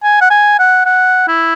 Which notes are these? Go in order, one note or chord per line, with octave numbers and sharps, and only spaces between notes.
G#5
F#5
G#5
F#5
F#5
E4